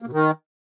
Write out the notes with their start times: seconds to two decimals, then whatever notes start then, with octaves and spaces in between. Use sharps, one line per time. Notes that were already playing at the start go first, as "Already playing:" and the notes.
0.02 A#3
0.07 B2
0.13 D#3